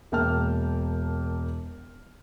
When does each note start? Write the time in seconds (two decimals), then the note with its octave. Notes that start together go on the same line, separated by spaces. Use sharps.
0.12 E1 A#3 G5 A5 F6